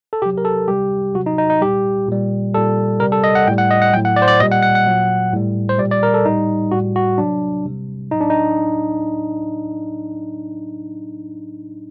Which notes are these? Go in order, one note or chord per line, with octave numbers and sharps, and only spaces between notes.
A4
C3 F#3 G4
A#4
A4
C3 G3 G4
C3 F#3 F#4
D#4
D#4
D#4
A#2 G3 G4
A#2 G3
A#2 G3 A4
C3 G3 A#4
A4
D#5
F#5
A2 G3 G5
F#5
D#5
F#5
A2 F#3 G5
F#5
D5
C5
D5
A#2 G3 D#5
F#5
F#5
F#5
A#2 F#3
A2 G3
C5
A#2 G3 D5
D5
A#4
A4
A2 G3 D#4
A2 G3 F#4
F#4
C3 F#3 D4
C3 G3
A2 F#3 D#4
D4
D#4